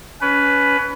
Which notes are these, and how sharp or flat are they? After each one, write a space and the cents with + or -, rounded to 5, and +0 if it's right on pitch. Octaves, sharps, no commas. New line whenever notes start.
C#4 +30 B4 +5